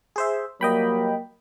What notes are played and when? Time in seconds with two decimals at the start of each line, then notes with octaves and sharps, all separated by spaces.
0.16 G#4 C5 E5
0.61 F#3 G3 A#3 D#5 G5 B5